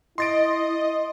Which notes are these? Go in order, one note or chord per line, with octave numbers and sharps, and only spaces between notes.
E4 D#5 C6 A6 D7